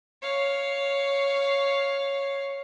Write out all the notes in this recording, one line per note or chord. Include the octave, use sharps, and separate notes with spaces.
C#5 F5